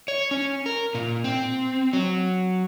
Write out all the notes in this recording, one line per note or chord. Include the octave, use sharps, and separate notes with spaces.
C#5
C#4
A#4
A#2
C4
F#3